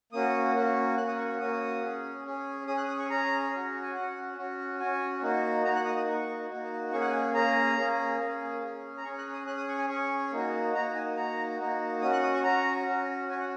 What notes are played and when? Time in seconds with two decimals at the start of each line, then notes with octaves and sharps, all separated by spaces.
0.13 A#3 C#4 F#4 D#6
0.55 A#3 C#4 F#4
0.97 A#3 C#4 F#4 F#6
1.08 D#6
1.19 C#6
1.29 C#6
1.40 A#3 C#4 F#4 D#6
1.82 C#4 G#4
2.25 C#4 G#4
2.67 C#4 G#4 D#6
2.78 F#6
2.88 D#6
2.99 C#6
3.10 C#4 G#4 A#5
3.52 C#4 F#4
3.82 G#5
3.94 C#4 F#4 F#5
4.37 C#4 F#4
4.79 C#4 F#4 G#5
5.22 A#3 D#4 F#4
5.64 A#3 D#4 F#4 A#5
5.75 F#6
5.85 D#6
5.96 D#6
6.06 A#3 D#4 F#4 C#6
6.49 A#3 D#4 F#4
6.92 A#3 C#4 G#4 C#6
7.01 F#5
7.06 G#5
7.34 A#3 C#4 G#4 A#5
7.77 A#3 C#4 G#4
8.19 A#3 C#4 G#4
8.62 C#4 G#4
8.97 A#5
9.04 C#4 G#4 C#6
9.18 F#6
9.33 D#6
9.47 C#4 G#4 F#6
9.57 D#6
9.69 C#6
9.78 G#5
9.89 C#4 G#4 C#6
10.32 A#3 D#4 F#4
10.74 A#3 D#4 F#4 A#5
10.95 G#5
11.17 A#3 D#4 F#4 A#5
11.59 A#3 D#4 F#4
12.02 C#4 F#4 D#6
12.12 F#6
12.23 D#6
12.34 C#6
12.44 C#4 F#4 A#5
12.87 C#4 F#4
13.29 C#4 F#4 G#5
13.40 F#5